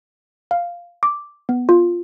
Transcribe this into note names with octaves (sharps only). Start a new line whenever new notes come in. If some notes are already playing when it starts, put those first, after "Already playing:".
F5
D6
B3
F4